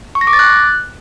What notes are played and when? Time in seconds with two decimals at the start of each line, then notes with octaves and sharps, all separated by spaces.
0.15 C#6
0.21 A#6
0.27 D6
0.33 A6
0.39 F#6